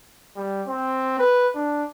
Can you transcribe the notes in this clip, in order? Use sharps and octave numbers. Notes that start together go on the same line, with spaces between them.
G3
C4
B4
D4